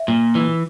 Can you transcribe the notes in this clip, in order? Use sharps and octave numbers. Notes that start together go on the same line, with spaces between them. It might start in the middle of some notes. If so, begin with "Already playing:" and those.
Already playing: E5
A#2
E3